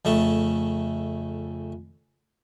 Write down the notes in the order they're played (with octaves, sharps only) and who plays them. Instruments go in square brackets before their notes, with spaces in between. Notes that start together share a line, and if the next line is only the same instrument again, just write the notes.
[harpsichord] F2 C#3 A3 A5